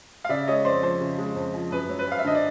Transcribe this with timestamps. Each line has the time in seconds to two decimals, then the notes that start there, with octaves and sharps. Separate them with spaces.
0.24 F5
0.29 C#3 D5 E5
0.47 G#3 C#5 D#5
0.65 F2 C5 D5
0.82 F3 C5
1.01 C#3
1.18 G#3
1.36 F2
1.54 F3
1.71 F#2 B4
1.89 F#3
1.99 B4
2.07 G#1 F5
2.19 E5
2.24 D3 D#5
2.35 D5